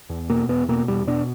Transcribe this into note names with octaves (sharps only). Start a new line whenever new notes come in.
E2
B2 A#3
E2 B3
B2 A#3
E2 G3
B2 D4